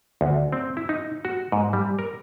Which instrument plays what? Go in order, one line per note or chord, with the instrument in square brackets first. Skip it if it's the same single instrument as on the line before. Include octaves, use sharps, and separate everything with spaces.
[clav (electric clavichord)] D2
C4
E4
D#4
F#4
G#2
G3
A#4